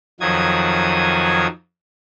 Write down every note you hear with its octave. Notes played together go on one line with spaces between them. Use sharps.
F2 D#3 F3 F#3 D#6 G#6